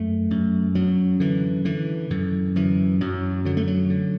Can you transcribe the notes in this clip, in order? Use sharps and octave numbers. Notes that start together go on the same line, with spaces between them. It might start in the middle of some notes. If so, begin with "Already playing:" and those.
Already playing: F#2 A3
F#2
F#2 F#3
D3 E3
D3 E3
F#2 D3
F#2 E3
F#2 F#3
D3 F#3
A3
F#3
D3